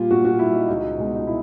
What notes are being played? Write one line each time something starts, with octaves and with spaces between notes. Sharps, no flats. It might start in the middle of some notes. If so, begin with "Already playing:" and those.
Already playing: A#2 G3 F4
A#2 F#4
F#4
G3 E4
D#4
C#2 D#4
B2 G#3
D#4
E4